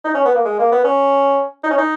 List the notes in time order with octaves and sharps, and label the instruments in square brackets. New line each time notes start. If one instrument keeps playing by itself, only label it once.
[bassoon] D#4
C#4
B3
A#3
G#3
A#3
B3
C#4
D#4
C#4
D#4